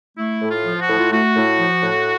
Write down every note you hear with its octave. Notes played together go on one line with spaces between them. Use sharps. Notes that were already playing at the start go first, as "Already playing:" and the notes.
A3 E4
A2
F4
F3
F#4
A2
F4
A3 F#4
A2
F3
A2